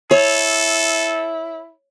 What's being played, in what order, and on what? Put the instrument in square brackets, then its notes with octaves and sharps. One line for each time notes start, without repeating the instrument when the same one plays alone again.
[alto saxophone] E4 [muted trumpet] A4 [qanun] C#5